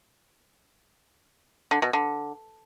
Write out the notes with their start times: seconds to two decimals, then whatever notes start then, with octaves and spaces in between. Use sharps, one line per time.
1.71 D3
1.82 B2
1.93 D3